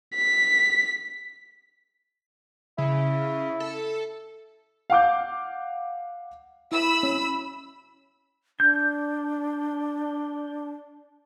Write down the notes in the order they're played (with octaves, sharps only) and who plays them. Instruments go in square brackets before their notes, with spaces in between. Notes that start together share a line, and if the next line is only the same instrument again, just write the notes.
[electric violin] B6
[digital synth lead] C#3 [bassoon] E4
[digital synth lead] A4
[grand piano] F5 F#5 D6 G6
[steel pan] E4 [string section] B5 E6
[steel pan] C#4
[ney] D4 [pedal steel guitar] G6